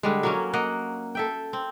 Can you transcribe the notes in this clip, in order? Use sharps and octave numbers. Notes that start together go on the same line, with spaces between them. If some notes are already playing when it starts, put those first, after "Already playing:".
D3 G3 G#3
F#3 A#3 C#4
A#3 D#5 F#5
A4 E5 G5
C4